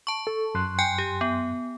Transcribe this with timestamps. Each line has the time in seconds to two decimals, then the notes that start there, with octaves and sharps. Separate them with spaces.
0.07 A5 C#6
0.27 A4
0.55 F#2 C6 F#6
0.79 G5 G#5 G6
0.98 G4
1.21 B3